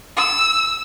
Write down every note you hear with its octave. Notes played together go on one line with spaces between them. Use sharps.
E6